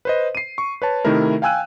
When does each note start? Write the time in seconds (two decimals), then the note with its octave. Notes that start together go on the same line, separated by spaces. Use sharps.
0.05 B4 C5 D#5
0.35 C7 D#7
0.58 C#6
0.82 B4 C#5 A5
1.05 C3 D#3 A3 D#4 E4 A#4
1.42 F5 G5 G#5 E6 F#6 D#7